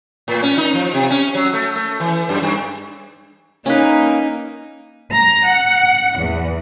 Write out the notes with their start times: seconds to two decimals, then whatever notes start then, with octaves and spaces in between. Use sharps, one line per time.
0.28 A2
0.42 C#4
0.58 D#4
0.74 F3
0.94 C3
1.10 C#4
1.35 F#3
1.54 A3
1.76 A3
2.00 E3
2.29 F#2
2.42 G2
3.66 A#3 C#4 D#4 B4
5.14 A#5
5.47 F#5
6.17 E2